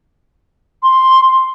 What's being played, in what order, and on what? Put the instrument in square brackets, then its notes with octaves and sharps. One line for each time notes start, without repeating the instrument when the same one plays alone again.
[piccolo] C6